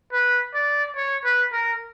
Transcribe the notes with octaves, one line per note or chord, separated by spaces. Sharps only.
B4
D5
C#5
B4
A#4